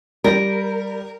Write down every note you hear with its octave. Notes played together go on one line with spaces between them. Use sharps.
G3 A#4